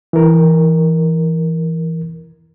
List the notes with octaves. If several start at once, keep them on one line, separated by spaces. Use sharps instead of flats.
E3 A#4